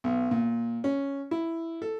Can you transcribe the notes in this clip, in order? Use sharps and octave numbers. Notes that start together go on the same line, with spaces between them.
B1
A#2
C#4
E4
A4